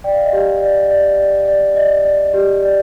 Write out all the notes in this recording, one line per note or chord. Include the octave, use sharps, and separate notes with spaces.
D5 G5
F5
D#5
G4 F5
D5
D5
D5
D5
D5 D#5
D5
G4
D5